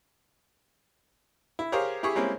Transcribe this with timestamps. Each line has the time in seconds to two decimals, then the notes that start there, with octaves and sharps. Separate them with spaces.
1.59 E4
1.72 G4 G#4 A#4 C5 C#5 F5
2.03 E4 G4 G#4 C#6
2.15 G3 G#3 A#3 C4 C#4 E4